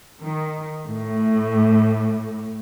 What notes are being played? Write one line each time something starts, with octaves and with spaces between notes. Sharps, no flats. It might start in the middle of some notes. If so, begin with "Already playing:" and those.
D#3
A2